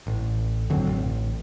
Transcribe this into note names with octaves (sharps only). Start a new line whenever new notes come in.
A1
F#2 D3 F#3 C4
A1